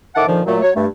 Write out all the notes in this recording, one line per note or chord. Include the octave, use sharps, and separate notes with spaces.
A2 D#3 E5 F#5 A5 D6
A#2 D3 D#3 F3
A#2 F#3 A3
F#3 C#5
G2 A3